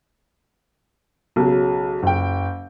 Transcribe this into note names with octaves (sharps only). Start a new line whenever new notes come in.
B1 C#3 F#3
F#1 G5